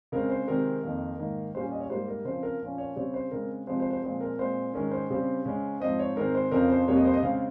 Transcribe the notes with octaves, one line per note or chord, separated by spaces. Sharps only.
C#3 G#3 C4 A#4
C5
C3 D#3 G#3 C4 A#4
F2 D#3 A#3
G#2 D#3 A#3
A#2 G3 C#4 C5
D#5
C#5
G#2 G3 A#3 C5
A#4
C#3 F3 C4 C5
A#4
A#2 F3 A#3 C#4
C#5
C#3 G3 C4 C#5
C5
C#3 G#3 C4 A#4
C3 F3 G#3 C4 C5
C5
C5
A#2 F3 G#3 C4 C5
A#4
A#2 G#3 C4 C5
G#2 D#3 G#3 C#4 A#4
C5
C#3 G3 C4
C#3 G#3 C#4
G#2 F3 C4 D#5
C#5
G#2 D#3 G#3 C4 A#4
C5
F2 C#3 F3 C4 A#4
C5
F2 C3 G3 A#3 C#5
D#5
C5
D#5
C#3 G#3 C4 F5